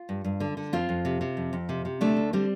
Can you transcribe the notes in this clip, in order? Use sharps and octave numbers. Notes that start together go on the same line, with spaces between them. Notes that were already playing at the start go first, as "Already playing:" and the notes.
Already playing: F4
G2
G2
D3
D3
F2 C4 F4
F2
C3
C3
F2
F2
C3
C3
D2 A3 D4
D2
D3 G3 C4